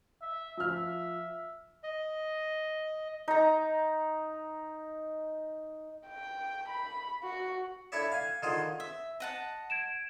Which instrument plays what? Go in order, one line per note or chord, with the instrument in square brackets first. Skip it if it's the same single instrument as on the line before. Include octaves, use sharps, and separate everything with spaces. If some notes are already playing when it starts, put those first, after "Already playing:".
[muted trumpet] E5
[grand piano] F3 F6 [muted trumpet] E5
[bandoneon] D#5
[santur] D#4 A#5
[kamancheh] G5
B5
F#4
[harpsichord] D4 E4 A4 C#5 D5 E5
F5 G#5
D3 D#3 F4 G#4 C5
[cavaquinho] E5
D#5 F#5 A5
[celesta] G#6 D7 E7